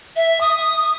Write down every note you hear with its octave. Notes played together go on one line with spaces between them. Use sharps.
E5
D#6